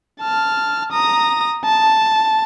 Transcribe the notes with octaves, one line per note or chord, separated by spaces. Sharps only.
A5 F6
A#5 D#6
A5